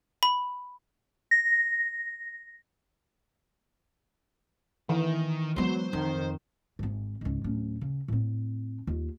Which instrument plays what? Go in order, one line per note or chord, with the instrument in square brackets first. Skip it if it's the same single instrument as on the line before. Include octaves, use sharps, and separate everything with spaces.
[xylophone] B5
[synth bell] A#6
[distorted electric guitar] D#3 [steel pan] E3
[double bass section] F#3 [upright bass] G#3 B3 [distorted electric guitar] C5 C6
[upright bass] F2 [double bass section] D#3
[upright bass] G#1 G#2
C#2 G#2
D1 C#4
C#3
A2 C4
D#2 F4